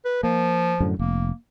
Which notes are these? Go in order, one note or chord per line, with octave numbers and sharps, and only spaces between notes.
B4
F3 A#3
F#2 A2 D3
F1 A#3